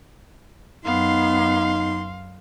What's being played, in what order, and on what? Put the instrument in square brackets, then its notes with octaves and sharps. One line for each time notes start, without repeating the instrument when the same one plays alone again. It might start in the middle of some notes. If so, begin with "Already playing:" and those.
[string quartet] F#2 C6 [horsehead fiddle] B3 [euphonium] D#4 [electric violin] F5